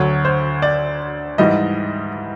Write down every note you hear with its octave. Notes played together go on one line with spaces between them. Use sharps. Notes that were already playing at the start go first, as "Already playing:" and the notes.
Already playing: D2 D3 F#3 C#5
C5
D5
G#2 E3 G3 D#5